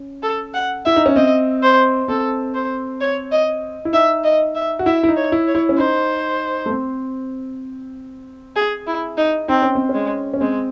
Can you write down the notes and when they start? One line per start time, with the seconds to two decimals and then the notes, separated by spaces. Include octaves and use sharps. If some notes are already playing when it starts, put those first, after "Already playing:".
Already playing: C#4
0.23 A4
0.54 F#5
0.85 E4 E5
0.96 D#4
1.06 C#4
1.16 C4 D#5
1.62 C5
2.08 C4 A4
2.55 C5
3.01 C#5
3.32 D#5
3.85 E4
3.93 D#4 E5
4.24 D#5
4.55 E5
4.79 F#4
4.86 E4 E5
5.03 E4
5.09 D#4
5.17 C#5
5.32 E4
5.48 C#5
5.55 E4
5.69 C#4
5.78 D#4 C5
6.66 A3
6.70 C4
8.56 G#4
8.87 E4
9.17 D#4
9.48 C4 D#4
9.62 C#4
9.75 C4
9.89 G#3 C#4
10.34 C#4
10.41 G#3 C4